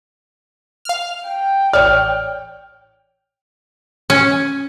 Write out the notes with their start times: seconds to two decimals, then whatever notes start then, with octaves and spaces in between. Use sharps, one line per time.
0.85 F5 F6
1.28 G5
1.73 A1 C#5 D5 F6
4.10 C#4